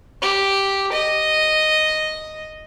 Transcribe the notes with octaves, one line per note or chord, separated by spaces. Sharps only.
G4
D#5